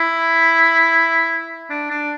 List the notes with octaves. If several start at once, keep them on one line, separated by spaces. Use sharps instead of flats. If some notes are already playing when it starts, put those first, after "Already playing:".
Already playing: E4
D4
D4